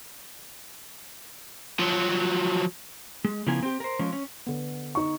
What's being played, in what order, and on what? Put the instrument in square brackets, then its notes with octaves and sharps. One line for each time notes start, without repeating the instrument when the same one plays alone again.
[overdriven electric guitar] F3 F#3
[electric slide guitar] G#3
C#3 F3 B3 E4 A#4 G#5
C4 G4
A#4 C5
F3 G#3 C#4
C#4
[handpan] D3 B3
[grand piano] D#4 C#6